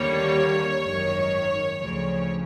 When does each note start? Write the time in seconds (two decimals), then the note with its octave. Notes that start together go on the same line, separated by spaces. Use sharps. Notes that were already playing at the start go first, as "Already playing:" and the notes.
Already playing: D#2 D3 G3 A#3 C#5
0.83 G#1 F#2 D#3
1.76 D2 C#3 F3